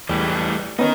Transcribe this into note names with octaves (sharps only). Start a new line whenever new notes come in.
E2 A2 E3 G3
D#3 B3 C#4 D#4